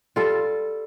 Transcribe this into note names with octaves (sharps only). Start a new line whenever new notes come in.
G3 F4 A4